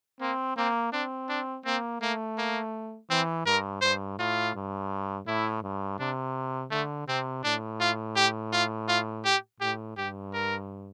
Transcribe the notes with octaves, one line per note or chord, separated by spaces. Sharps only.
A#3 C4
A#3 C4
C4 D4
D4
A#3 C4
A3 A#3
A#3
E3 C4
G2 A#4
G2 C5
A2 F4
G2
A2 E4
G2
C3 D4
D3 A3
C3 C4
A2 D4
F4
G4
F4
F4
G4
A2 G4
G2 G4
A#4